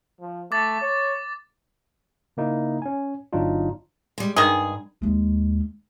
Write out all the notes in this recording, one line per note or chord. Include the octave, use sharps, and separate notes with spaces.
F3
A3 D6 A6
C#5
C#3 A#3 D#4 E4
C#4 G#5
G1 F#3 D4 D#4 F4
G3 G#3
G2 D#3 G#3 G#4
D#2 G#3